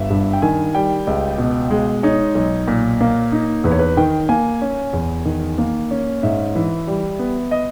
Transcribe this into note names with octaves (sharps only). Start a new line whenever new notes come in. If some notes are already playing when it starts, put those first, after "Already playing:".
Already playing: G1 E5
G2
G5
D#3 G#5
G3 G5
C#2
B2
G#3
D#4 C#5
B1
A#2
A#3
D#4
E2 B4
C#5
B4
D#3 G5
A#3 G#5
C#4
E2
D#3
A#3
C#4
G#2 E5
E3
G3
B3
D#5